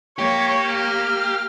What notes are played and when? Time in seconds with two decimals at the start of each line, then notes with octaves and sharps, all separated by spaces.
0.18 A#3 G4 C#5
0.70 F6